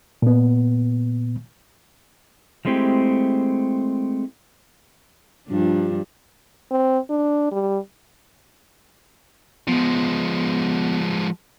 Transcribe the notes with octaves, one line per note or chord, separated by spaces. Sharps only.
A#2 B3
F3 G#3 A3 C4 E4 G4
G2 F3 D4
C4
D4
G3
F3 G#3 B3